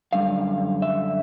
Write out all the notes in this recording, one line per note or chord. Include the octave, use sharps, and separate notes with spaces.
F#2 D3 G3 F5
E5